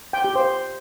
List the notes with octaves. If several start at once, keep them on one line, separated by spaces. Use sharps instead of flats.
G5
G4
C5